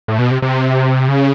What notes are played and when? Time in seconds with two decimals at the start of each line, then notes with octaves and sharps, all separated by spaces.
0.08 A2
0.19 B2
0.31 C3
0.42 C3
1.08 C#3